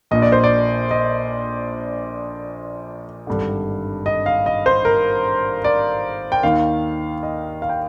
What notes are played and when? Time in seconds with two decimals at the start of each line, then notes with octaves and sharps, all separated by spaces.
0.11 A#1 A#2 D#5
0.22 D5
0.32 C5
0.44 D5
0.91 D#5
3.27 G#1 G2 D3
4.06 D#5
4.26 F5
4.46 D#5
4.66 C5
4.85 A#4
5.64 D5
6.32 G5
6.43 D#2 D#3 F5
7.23 D#5
7.62 F5
7.69 G5